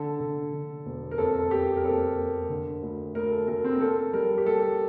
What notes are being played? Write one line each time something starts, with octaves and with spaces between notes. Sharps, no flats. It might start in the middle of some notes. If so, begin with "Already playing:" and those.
Already playing: D3 A4
D3
D3
E1
A#4
F2 A4
A4
A#3 G4
A#4
F2 A4
A#3
D3
D2
D2 A#4
A4
D2 A#4
C4
A#4
A#3 A4
G3 A#4
G4
G3 A4